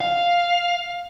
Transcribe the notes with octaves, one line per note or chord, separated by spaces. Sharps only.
F5